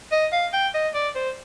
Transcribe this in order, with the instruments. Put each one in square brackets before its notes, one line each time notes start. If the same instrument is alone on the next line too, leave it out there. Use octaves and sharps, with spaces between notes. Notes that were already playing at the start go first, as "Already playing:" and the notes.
[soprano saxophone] D#5
F5
G5
D#5
D5
C5